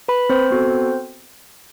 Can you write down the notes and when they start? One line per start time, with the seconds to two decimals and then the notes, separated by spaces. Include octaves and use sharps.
0.08 B4 B5
0.29 C4 C5
0.51 B3 F#4 A4